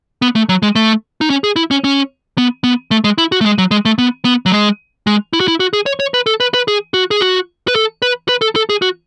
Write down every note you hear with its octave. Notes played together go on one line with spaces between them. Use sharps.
B3
A3
F#3
G#3
A3
D#4
C#4
G#4
E4
C#4
C#4
B3
B3
A3
G#3
E4
F#4
A3
G#3
F#3
G#3
A3
B3
B3
F#3
G#3
G#3
E4
F#4
E4
F#4
G#4
C#5
C#5
B4
A4
B4
B4
G#4
F#4
G#4
F#4
B4
A4
B4
B4
A4
A4
G#4
F#4